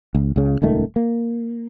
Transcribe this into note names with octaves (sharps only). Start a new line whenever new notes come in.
C#2
C#2 C#3
D#1 C#2 D#3 A3
A#3